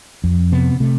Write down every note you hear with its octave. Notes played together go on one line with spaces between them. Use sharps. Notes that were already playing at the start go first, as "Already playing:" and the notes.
F2
C3 B3
C3 A3